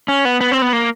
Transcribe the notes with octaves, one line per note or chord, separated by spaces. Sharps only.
C#4
B3
B3
C4
B3
A#3